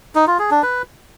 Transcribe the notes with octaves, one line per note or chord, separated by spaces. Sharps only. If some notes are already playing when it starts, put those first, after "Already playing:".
D#4
F4
G#4
D4
B4